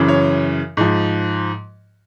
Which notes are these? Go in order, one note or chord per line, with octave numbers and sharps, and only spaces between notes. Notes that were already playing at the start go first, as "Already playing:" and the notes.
Already playing: F#2 C#3 E3
C#5
G#2 F3